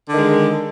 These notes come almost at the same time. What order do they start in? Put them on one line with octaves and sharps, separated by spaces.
D3 D#3 G#3